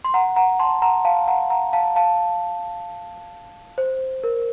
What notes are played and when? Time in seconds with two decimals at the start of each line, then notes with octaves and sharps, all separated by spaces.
0.05 C6
0.14 F#5 A#5
0.36 F#5 A#5
0.59 A5 C6
0.82 F#5 A#5
1.05 F5 A5
1.28 F#5 A#5
1.50 F#5 A#5
1.73 F5 A5
1.96 F5 A5
3.78 C5
4.24 A#4